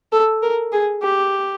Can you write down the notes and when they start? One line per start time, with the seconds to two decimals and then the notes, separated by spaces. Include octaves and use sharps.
0.12 A4
0.42 A#4
0.73 G#4
1.03 G4